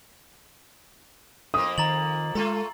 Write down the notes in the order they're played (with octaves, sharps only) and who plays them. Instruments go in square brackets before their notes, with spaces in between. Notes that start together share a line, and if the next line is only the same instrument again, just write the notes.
[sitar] F2 A#3 [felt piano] D#6
[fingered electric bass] D#3 [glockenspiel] A#5 A6 F#7
[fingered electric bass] G#3 [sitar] A3 F4 A4